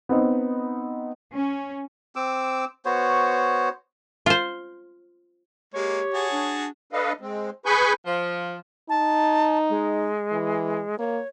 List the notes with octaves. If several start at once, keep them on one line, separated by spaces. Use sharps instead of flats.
B3 C4 D#4
C#4
C4 D6 E6
B3 F#4 C5 C#5
F4 C5
G#3 A#3 G4 C#5
F#4 G#4 A5
D4
D4 A4 B4 D#5 F5
G#3 C4
G#4 B4 G#5 B5 C#6 G6
F3
D#4 A5
G#3
E3
A#3 C#5